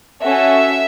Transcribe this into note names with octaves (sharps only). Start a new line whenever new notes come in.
C#4 F#4 A4 E5